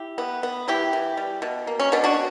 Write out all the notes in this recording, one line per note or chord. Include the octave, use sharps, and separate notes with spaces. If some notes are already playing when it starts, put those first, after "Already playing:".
Already playing: E4 G4
B3
B3
E3 E4 G4
E3
G3
B2
A#3
C#4
B2 B3 D4
D4 F#4